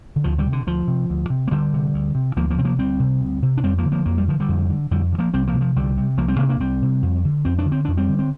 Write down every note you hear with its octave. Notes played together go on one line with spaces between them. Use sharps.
D3
D2 F3
D3 G3
C3
D3
D2 F3
C3
D2
C3
A#3
D2 D3 G3
C3
D2
C3
D2 F3 A#3
F3 A#3
C3 C4
F3 A#3
D2 G3 C4
C3
D2
C3
D4
F2 G3 C4
F3 A#3
D3
F3 A#3
F2 A#3
G3
D3 F3
D3 G3
F2
D3
F2 D3 G3
D3
F3 A#3
C2 G3 C4
F3 A#3
C3
F3
C2 D3 G3
C3
C2 F3 A#3
G3 C4
C3 A#3 D4
A#3 D4
C2 G3 C4
C3
F2
D3
F2 C4
D4
D3
C4
F2 D4
G3 C4
D3
C4